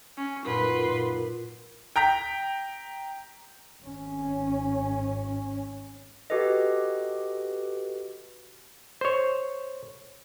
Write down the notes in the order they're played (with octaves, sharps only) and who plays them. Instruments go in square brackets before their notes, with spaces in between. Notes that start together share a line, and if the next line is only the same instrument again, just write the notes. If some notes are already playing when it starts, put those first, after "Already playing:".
[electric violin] C#4
[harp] F#2 A#2 D#4 [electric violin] B4 C6
[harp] A#2
[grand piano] G5 A#5 G6 B6
[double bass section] G#1 C#4
[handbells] F#4 G4 A4 B4 D#5
[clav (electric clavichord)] C5 C#5